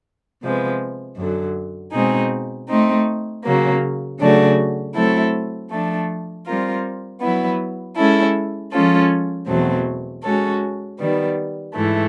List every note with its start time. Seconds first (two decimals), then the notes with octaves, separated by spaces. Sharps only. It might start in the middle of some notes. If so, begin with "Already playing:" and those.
0.42 C3 F3 G#3 B3
1.17 F#2 D3 F#3
1.93 B2 G#3 C4 D#4 G#4
2.68 A3 C4 D#4
3.44 C#3 F#3 A#3
4.19 C#3 F#3 A3 D4 F#4
4.95 F#3 A3 C4 E4 A4
5.70 F3 A3 D4
6.46 G3 C4 F4 A#4
7.22 F#3 B3 E4
7.97 G#3 C#4 E4 A4
8.72 F3 G#3 C#4 F4 A4
9.48 E2 B2 F#3 A3 C4
10.23 G#3 C#4 F#4 A4 C#5
10.99 D#3 G3 B3
11.74 G#2 E3 A3